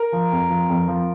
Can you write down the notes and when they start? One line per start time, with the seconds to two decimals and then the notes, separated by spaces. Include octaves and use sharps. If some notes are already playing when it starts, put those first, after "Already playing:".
Already playing: A#4
0.13 F3
0.32 F2
0.50 F3
0.69 F2
0.88 F3